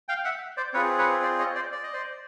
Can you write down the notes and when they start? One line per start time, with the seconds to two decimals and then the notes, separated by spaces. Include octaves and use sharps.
0.09 F5 G5
0.24 E5 F#5
0.57 C5 D5
0.73 C4 F4 G#4 B4 C#5
0.98 B4 C#5
1.23 C5 D5
1.39 C#5 D#5
1.55 C5 D5
1.72 D5
1.83 D#5
1.93 C5 D5